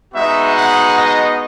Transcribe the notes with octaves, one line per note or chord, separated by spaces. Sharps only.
G#3 B3 D#4 F#4 E5
F#5
D#5